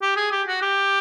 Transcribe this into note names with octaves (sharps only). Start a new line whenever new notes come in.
G4
G#4
G4
F#4
G4